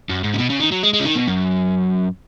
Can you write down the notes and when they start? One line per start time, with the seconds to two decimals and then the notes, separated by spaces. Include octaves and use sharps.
0.10 F#2
0.24 G#2
0.34 C#3
0.38 B2
0.50 C#3
0.60 D#3
0.72 F#3
0.83 G#3
0.94 G#3
1.00 C#3
1.05 D#3
1.16 B2
1.28 F#2